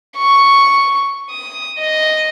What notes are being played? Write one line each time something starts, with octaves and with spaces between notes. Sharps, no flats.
C#6
D#6
D#5